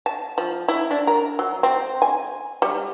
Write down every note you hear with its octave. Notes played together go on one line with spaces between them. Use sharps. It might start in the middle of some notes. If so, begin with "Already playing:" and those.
A5
F3
E4
D4
A#4
F#3
C4
G#5
G3